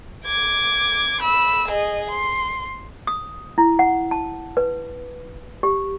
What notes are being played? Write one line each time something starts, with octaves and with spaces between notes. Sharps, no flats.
D6 G#6
B5 E6
G#4 D#5
C6
D#6
E4
F#5
A5
B4
G4